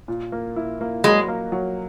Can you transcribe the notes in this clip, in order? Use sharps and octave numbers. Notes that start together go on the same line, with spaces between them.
A#2
A#3
E4
A#3
F#3 G#3
A#3
F#3